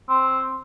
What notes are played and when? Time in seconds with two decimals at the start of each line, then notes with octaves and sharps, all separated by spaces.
0.09 C4